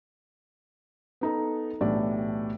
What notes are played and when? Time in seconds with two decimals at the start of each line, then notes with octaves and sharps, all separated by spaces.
1.21 B3 D#4 A4
1.81 B1 A2 E3 D4 G4 D5